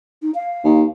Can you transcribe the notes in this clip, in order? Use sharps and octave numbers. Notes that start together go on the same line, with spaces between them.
D#4
F5
D#2